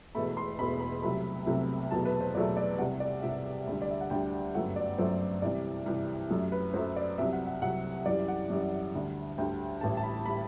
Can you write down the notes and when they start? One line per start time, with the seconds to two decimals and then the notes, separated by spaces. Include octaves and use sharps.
0.15 E1 E2 B2 A3 B5
0.37 C6
0.59 E1 E2 B2 A3 B5
0.81 B5
1.03 C2 C3 F#3 A3 B5
1.46 C2 C3 F#3 A3
1.91 E2 B2 F#3 A3 A5
2.05 B4
2.21 C5
2.34 E2 B2 F#3 A3 D5
2.57 D5
2.79 C2 C3 G3 F#5
3.00 D5
3.22 C2 C3 G3 E5
3.67 D2 D3 G3
3.82 D5
3.91 E5
4.01 F#5
4.10 D2 D3 G3 G5
4.54 G1 F#2 F#3 A3 F#5
4.76 D5
4.98 G1 F#2 F#3 A3 C5
5.42 C2 C3 E3 G3 D5
5.86 C2 C3 E3 G3
6.30 F#2 F#3 A3
6.52 B4
6.74 F#2 F#3 A3 C5
6.96 D5
7.18 C2 C3 F#3 E5
7.33 F#5
7.47 F#5
7.62 C2 C3 F#3 F#5
8.06 F#2 E3 G3 D5
8.28 F#5
8.50 F#2 E3 G3
8.94 D2 D3 G3
9.38 D2 D3 G3 G5
9.81 A1 A2 G3 A5
9.97 A5
10.03 B5
10.25 A2 G3 B5